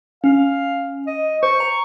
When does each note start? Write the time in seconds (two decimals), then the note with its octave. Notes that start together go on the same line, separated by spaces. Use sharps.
0.24 C#4 F5
1.07 D#5
1.43 C5 C#6
1.60 A#5